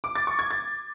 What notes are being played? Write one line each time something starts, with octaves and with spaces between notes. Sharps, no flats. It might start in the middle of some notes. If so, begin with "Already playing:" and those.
D6
A6
C#6
G#6
A6